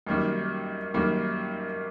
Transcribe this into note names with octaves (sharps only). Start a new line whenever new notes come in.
F#2 D#3 G3 A#3
F#2 D#3 G3 A#3